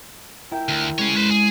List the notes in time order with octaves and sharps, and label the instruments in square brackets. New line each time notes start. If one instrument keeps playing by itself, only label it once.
[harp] E4 A#4 G5
[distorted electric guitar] D2
[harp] G#3 C#4 [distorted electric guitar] G#4 C#5
[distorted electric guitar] B4 C5
G#4